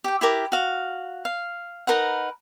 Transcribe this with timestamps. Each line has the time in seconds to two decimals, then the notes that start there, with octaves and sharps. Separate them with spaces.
0.04 G4 G5
0.21 E4 G4 A#4 D6
0.52 F#4 F5
1.25 F5
1.87 D#4 A#4 B4 F#5